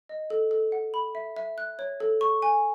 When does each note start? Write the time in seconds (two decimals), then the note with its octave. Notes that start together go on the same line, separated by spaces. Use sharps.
0.09 D#5
0.30 A4
0.51 A4
0.72 F#5
0.94 B5
1.15 E5
1.36 E5
1.58 F#6
1.79 C#5
2.00 A4
2.21 C#6
2.42 G#5